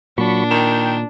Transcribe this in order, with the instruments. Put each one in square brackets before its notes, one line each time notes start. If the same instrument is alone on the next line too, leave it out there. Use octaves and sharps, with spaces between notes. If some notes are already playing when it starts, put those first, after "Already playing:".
[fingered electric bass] A#2 [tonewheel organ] F#3 B5 C#6 [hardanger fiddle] D4
[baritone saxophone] D#3 [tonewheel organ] G5